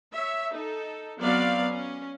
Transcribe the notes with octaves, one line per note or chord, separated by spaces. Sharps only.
C#5 E5
D#4 A4
F#3 B3 C4 D5 F5
C#4